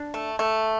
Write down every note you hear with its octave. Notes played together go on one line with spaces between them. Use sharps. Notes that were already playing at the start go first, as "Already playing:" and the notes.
Already playing: D4
A3
A3